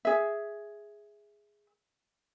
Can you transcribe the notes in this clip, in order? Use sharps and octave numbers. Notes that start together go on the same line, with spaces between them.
G#4 E5